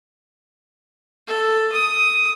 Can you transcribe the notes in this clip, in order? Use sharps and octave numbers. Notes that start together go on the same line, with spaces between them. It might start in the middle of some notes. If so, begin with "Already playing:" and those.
A4
D#6